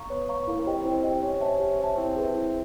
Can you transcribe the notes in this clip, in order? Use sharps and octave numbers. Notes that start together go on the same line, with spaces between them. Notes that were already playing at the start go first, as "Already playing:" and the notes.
Already playing: F5 A#5 C#6
B3 C#5
F5 A#5 C#6
A#3 E4
C#4
G4 C5 D#5 G5
C4
C4 E4
G4 C5 D#5 G5
C#4 G4
C5 E5 A5
G4
C5 E5 A5
C4 E4
G#4 B4 E5
E4